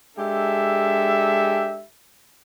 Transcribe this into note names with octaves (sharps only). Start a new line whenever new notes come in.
G#3 D4 G4 A4 E5